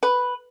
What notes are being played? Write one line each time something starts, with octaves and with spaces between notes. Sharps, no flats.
B4